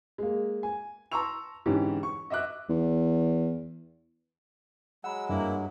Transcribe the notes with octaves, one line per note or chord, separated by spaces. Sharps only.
G#3 A#3
G#5
A5 A#5 C6 C#6 E6 F7
G#2 D3 E3 C#4 D#4 G4
C#6
D#5 E5 D6 F#6
E2
F#3 G#3 F#5 B5 E6
G2 A#3 E4